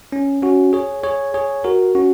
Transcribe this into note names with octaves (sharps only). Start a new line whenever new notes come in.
C#4
C#4 F#4
G#4 C#5
G#4 C#5
G#4 C#5
F#4 A#4
C#4 F#4